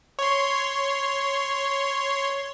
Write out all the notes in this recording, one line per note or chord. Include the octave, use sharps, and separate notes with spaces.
C#5 C6